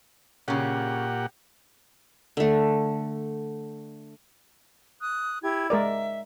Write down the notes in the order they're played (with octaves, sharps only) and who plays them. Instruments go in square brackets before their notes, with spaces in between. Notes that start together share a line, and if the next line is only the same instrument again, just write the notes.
[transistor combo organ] A#2 G4 F#5 [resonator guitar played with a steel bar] C#3 C#4
[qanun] D3 A3
[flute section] D#6 F#6
E4 G4 G#6
[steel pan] G#3 A#4 D5 [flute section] E5